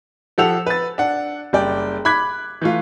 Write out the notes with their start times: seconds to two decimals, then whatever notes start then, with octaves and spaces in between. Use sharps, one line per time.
0.38 F3 G4 A4 F#5 E6 F7
0.66 B4 A6
0.98 D4 F#5
1.53 F#1 G3 D5 G5
2.05 B5 D6 F#6 G#6 B6
2.62 E3 A3 F4